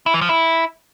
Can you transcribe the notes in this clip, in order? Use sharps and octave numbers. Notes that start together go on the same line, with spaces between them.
E4
E3
F3
E4